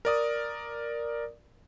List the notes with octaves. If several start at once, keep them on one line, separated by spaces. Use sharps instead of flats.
A#4 D5 D#6